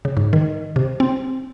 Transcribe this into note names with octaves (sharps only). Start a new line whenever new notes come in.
C#3
G#2
D#3
C3
C4